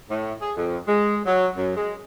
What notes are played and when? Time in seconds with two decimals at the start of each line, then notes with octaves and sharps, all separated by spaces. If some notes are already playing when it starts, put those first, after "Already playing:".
0.09 A2
0.40 G#4
0.56 F2
0.87 G#3
1.25 F#3
1.56 F#2
1.75 G#3